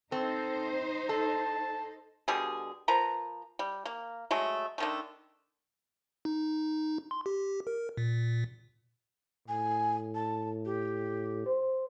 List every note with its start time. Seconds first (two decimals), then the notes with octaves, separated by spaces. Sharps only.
0.12 C4 D#4 A4 C5
1.09 A4 A5
2.28 B2 D3 G3 G#4
2.88 F3 A#4 B4 A#5
3.59 G3
3.85 A#3
4.31 F#3 G#3 A3
4.78 D3 D#3 A3
6.25 D#4
7.11 C6
7.26 G4
7.67 A#4
7.97 A#2
9.48 A2 G#5
10.15 A5
10.65 G4
11.46 C5